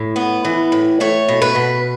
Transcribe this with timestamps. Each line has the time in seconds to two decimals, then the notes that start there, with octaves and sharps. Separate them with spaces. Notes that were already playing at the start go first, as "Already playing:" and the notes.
Already playing: A2
0.16 B3
0.45 E3
0.72 A2
1.00 A3 C#5
1.28 B2
1.42 B4
1.55 B2